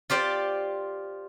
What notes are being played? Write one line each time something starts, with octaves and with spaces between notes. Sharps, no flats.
F4 G4 C5 D5